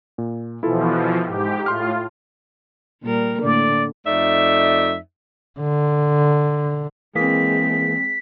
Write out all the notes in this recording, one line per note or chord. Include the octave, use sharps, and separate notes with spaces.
A#2
B2 E3 F3 E4 F4 A4
G#2 G4
A2 F4 C6 F6
A#2 G3 A#4
A2 D3 A#3 D5
F2 A3 D#4 D5 E5
D3
E3 G#3 A#3 C4 G#4 B6